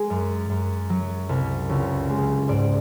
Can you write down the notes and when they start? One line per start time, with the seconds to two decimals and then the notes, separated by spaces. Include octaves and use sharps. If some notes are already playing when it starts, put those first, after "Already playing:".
Already playing: G#3
0.10 F#2
0.50 F#2
0.90 F#3
1.29 C2
1.69 C#2
2.09 G#3
2.48 G#2 D5